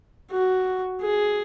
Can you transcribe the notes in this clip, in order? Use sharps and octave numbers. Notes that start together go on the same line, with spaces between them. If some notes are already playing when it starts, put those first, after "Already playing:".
F#4
G#4